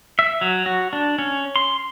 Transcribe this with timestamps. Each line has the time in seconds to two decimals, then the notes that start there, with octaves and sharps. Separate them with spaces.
0.19 E5
0.41 F#3
0.66 F#4
0.93 D4
1.19 C#4
1.56 C6